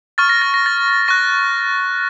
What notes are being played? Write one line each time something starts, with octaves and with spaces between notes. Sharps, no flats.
C#6 F6 A6
A#6
A6
A#6
A6
C#6 F#6 A#6